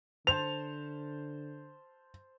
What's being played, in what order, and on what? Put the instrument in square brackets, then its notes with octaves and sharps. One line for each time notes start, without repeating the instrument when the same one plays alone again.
[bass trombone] D3 [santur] C5 A5 [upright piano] F7